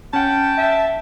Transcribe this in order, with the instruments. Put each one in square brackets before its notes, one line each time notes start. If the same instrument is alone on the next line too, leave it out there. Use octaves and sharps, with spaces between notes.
[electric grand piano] C#4 F#5 [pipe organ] G5 [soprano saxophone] A5
[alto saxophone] E5